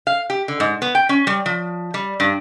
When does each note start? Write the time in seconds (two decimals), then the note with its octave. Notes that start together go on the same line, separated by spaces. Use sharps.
0.07 F5
0.30 G4
0.48 D3
0.60 G#2
0.82 B3
0.95 G5
1.09 C#4
1.27 G3
1.46 F3
1.94 G3
2.20 G2